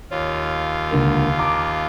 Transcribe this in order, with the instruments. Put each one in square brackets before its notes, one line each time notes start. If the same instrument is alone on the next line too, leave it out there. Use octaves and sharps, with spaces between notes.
[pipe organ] D#2 F4 [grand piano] C#5
[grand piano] C#2 D3 A#3
A5 A#5 D6